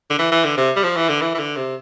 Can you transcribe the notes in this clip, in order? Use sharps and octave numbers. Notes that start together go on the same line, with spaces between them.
D3
E3
E3
D3
C3
G3
F3
E3
D3
E3
E3
D3
C3